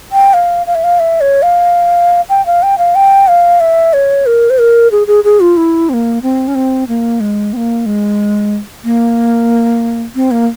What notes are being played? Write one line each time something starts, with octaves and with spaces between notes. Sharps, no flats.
G5
F5
F5
E5
F5
E5
C#5
F5
G5
F5
G5
F5
G5
F5
E5
C#5
A#4
C5
A#4
G#4
G#4
G#4
F4
E4
C4
A#3
C4
C#4
C4
A#3
G#3
C4
A#3
G#3
A#3
C4
A#3